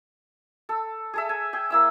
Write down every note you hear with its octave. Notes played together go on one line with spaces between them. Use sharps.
A4
G#4 A4 E5
G#5
G#4 G5
A#3 E4 E6